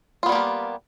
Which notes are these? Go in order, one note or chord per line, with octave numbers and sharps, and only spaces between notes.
G3 A#3 B3 F4 G4